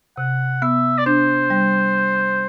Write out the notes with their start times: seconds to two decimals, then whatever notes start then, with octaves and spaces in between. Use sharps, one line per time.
0.18 C3 F#5
0.62 B3 E5
0.98 D5
1.06 D4 C5
1.50 G3